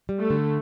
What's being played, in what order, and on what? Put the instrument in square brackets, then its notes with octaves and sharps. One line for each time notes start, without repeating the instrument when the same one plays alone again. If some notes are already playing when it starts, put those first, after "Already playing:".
[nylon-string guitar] G3
[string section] A3
[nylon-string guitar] D3